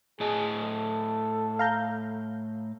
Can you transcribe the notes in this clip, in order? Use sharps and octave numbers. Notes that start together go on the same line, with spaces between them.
A2 G#4 D#5 A5
A4
F5 A#5 G6